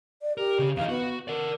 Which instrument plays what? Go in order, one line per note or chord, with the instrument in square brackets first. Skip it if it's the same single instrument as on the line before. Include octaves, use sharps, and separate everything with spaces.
[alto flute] D5
[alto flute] G4 [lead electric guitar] A#4
[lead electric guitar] C#3 C#4
[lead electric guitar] E2 D#4 [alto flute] F5
[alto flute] B3 [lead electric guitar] F#4
[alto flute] A#4 [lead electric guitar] D5 F#5